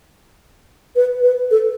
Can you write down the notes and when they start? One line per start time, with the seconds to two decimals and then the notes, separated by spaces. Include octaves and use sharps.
0.96 B4
1.23 B4
1.51 A4